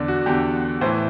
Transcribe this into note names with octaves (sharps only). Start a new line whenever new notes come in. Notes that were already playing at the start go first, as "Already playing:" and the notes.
Already playing: E2 D3 D5
F#4
E2 D3 G4
A2 E3 C5